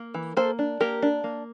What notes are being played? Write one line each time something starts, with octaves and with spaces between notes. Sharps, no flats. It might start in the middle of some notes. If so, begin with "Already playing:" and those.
Already playing: A#3
E3
A#3 A4 C5
D4
A#3 G4 A#4
D4
A#3